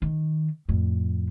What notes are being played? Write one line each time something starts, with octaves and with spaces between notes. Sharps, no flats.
D#3
F2 A2